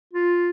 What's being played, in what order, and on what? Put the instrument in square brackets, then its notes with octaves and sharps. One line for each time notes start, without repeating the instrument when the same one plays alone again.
[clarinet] F4